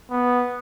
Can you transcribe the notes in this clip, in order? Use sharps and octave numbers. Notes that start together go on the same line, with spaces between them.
B3